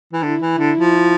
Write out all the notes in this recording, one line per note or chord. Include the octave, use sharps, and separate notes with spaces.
E3
D3 E4
E3
D3
F3